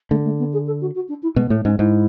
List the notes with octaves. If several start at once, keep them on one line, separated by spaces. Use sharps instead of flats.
D3 A3
A3
B3
G#4
A4
F#4
F#4
D4
E4
B2 G#3
B3
A2 A3
G#2 C#4
G#2 E4